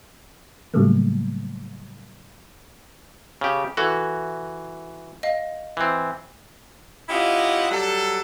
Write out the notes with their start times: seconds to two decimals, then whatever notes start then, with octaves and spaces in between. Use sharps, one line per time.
0.74 A2 C#3 F#3 G3 A3 A#3
3.41 C#3 G4
3.77 E3 F#4 A4
5.23 D#5 F5
5.77 E3 C4
7.09 C#4 E4 F4 G4 D#5 F#5
7.70 F#3 G3 A4